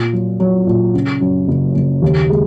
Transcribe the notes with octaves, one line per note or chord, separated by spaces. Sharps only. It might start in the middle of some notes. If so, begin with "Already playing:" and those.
Already playing: A#2
F#3
F#3
A#2
C#3
F#2
F#1
F#1
D#2
G#3